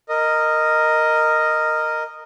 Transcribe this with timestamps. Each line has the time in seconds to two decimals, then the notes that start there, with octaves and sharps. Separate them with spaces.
0.09 A#4 D#5